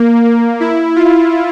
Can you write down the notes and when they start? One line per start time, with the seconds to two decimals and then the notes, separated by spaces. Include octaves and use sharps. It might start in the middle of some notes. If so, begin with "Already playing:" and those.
Already playing: A#3
0.24 A#3
0.60 E4
0.96 F4